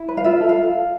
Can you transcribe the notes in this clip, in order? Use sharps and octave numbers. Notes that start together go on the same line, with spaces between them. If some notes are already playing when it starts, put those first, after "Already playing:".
Already playing: E4
B4
F5
F4 E5
A4
F5